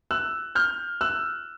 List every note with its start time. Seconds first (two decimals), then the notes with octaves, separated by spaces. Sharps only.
0.11 E6 F#6
0.55 F6 G6
1.01 E6 F#6